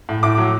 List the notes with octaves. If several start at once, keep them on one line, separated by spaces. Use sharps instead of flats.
A2
A2 D6
F#3